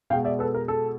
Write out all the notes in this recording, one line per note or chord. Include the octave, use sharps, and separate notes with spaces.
B2 G#3 F5 G5
D5 E5
A4 B4
A#4
A4